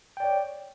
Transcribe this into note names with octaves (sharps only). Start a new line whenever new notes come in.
C#5 D5 G5